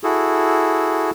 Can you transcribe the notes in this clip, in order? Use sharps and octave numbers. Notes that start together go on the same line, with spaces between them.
E4 F#4 G#4 A4